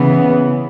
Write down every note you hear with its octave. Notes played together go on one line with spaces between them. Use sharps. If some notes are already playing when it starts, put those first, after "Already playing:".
Already playing: C#3 E3 B3